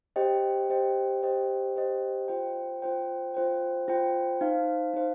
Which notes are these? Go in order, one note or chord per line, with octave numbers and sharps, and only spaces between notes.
G4 C5 D#5 G5
G4 C5 D#5 G5
G4 C5 D#5 G5
G4 C5 D#5 G5
F4 C5 G5
F4 C5 G5
F4 C5 G5
F4 C5 G5
D#4 C5 F5
D#4 C5 F5